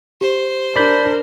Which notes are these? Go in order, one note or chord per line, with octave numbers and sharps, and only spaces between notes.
G4 C5
D4 A#4 D5 B5 G6